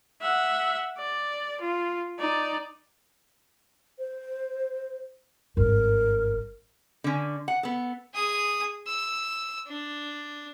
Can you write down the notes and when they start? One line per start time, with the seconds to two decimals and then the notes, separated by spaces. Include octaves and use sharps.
0.21 E5 F#5
0.98 D5
1.61 F4
2.19 D#4 D5
3.99 C5
5.57 G#1 G2 A#4
7.04 D3 C#4
7.48 F#5
7.63 B3 A4
8.14 G#4 D#6
8.87 E6
9.67 D4